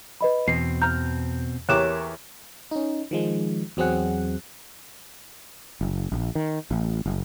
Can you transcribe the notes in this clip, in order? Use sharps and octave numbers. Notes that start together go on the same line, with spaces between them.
B4 D#5 B5
E2 B2 C4 C7
A#5 F6 G6
E2 G4 A#4 C#5 D6 F#6 E7
C#4 D#4
D#3 F3 G#3
E2 F#3 C4 G#4 F#5
F#1
A#1
D#3
A1
F#1